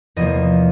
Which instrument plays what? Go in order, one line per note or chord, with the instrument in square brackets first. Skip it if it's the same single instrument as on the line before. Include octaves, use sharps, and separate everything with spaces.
[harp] E2 C3 F3 A#3 D#5